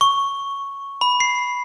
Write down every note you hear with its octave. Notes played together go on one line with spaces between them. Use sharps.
C#6
B5
C7